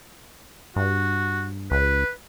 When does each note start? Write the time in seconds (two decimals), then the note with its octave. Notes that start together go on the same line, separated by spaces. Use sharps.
0.76 G2 F#4
1.71 C#2 B4